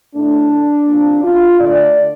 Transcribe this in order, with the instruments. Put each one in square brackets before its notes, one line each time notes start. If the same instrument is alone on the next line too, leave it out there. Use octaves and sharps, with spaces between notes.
[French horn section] A2 A3 D4
C3 F3 A#3
F4
D3 A3 D5